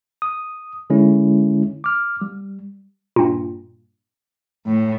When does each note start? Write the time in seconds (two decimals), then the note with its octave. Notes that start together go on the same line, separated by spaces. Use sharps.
0.22 D#6
0.90 D3 G#3 C#4 E4
1.84 D6 F6
2.21 G3
3.16 G2 A#2
4.66 A2